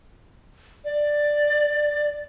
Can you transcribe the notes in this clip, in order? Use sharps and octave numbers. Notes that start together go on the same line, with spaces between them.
D5